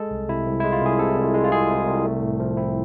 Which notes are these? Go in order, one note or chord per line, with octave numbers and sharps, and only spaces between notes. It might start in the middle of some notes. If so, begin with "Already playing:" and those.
Already playing: G#3 A4
C2
C3 E4
C2
G#3 E4
F4
C2 G#4
C3 A4
C2
G#3
F4
C2 G#4
C3
C2
A3
A2
F3
C4 E4